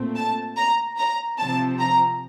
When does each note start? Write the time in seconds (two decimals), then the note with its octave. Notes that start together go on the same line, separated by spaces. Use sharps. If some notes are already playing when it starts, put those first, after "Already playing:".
Already playing: A#2 A3 C4
0.16 A5
0.57 A#5
0.98 A#5
1.39 C3 F3 C4 A5
1.79 A#5